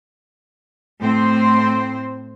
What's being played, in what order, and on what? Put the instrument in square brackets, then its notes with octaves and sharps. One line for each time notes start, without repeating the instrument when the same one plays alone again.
[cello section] A2 C4 C5